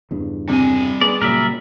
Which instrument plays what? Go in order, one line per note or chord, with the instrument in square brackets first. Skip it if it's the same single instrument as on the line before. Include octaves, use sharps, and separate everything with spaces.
[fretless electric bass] E2 G2 C#3
[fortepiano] C3 [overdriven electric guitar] G3 G#5
[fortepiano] G#3 [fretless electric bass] B3 [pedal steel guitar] D5
[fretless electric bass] A#2 C#3 F#3 [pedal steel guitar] A#4 D5 E5